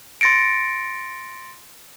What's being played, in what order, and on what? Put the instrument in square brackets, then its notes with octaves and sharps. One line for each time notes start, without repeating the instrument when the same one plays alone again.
[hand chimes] C6 A6 A#6 C#7 D7